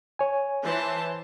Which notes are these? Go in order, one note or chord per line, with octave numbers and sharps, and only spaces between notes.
C#5 G#5
E3 C5 A5